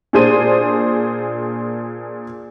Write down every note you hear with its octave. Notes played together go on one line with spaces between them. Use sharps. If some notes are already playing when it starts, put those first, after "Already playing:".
A#2 D4 G#4 C5 D#7